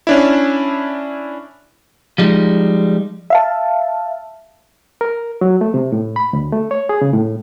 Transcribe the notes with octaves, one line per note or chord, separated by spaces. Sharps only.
C#4 D4 E4
F3 G3 G#3 D#4
E5 F5 A5
A#4
F#3
A3
C3
A2
B5
D2
A3
C#5
G#4
C#3
A2